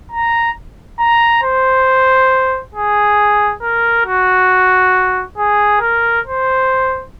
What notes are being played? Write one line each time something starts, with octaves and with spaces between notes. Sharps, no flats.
A#5
A#5
C5
G#4
A#4
F#4
G#4
A#4
C5